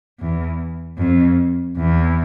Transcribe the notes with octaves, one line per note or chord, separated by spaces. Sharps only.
E2
F2
E2